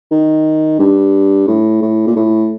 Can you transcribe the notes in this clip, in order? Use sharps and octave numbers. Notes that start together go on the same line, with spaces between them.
D#3
G2
A2
A2
A#2
A2